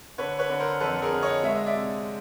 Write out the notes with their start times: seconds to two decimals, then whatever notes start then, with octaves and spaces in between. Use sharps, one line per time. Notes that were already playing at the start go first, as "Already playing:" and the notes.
0.18 D3 B4 C#5
0.39 B4 C#5
0.49 D3
0.60 A#4 C5
0.80 F2 A4 B4
1.02 G#4 A#4
1.12 D3
1.23 C#5 D#5
1.43 G#3 E5
1.55 D#5
1.66 D5 E5
1.74 C3